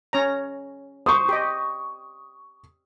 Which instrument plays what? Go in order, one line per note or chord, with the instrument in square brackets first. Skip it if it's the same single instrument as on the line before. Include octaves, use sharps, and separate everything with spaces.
[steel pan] C#4 C#5 A#5
[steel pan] C5 [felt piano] C#6 D#6
[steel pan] G4 D#5